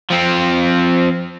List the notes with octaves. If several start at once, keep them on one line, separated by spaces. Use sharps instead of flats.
F3 C4